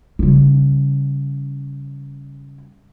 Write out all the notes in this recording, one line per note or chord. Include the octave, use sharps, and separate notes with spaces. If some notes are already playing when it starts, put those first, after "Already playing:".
C#3 G3